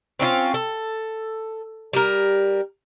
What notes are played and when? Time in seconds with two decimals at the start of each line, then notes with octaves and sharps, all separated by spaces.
0.19 C4 C#4 E4 F4
0.54 A4
1.93 G3 A#4